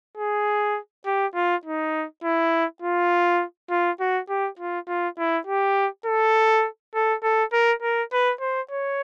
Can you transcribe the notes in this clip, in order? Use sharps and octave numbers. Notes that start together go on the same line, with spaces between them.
G#4
G4
F4
D#4
E4
F4
F4
F#4
G4
F4
F4
E4
G4
A4
A4
A4
A#4
A#4
B4
C5
C#5